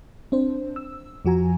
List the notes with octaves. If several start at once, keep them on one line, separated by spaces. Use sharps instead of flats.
C4 D4 C5
E6
F2 F3 F#4 G#5 A#5